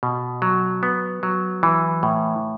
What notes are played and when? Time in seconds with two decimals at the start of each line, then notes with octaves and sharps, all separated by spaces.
0.03 B2
0.42 F#3
0.83 B3
1.23 F#3
1.63 E3
2.03 A2